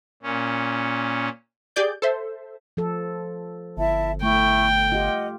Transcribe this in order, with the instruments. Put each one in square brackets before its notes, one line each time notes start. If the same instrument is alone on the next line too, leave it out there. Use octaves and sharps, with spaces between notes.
[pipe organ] A#2 C#4
[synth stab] G4 G#4 D5 G6
A4 C5 E5
[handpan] F3 A4
[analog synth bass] G1 [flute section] E4 E5 A5
[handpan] A3 [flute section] E4 C#6 [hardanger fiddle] G5
[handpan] F4 G4 [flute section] D#5 F#5